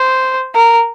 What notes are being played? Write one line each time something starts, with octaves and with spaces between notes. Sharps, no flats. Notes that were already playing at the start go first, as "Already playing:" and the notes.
Already playing: C5
A#4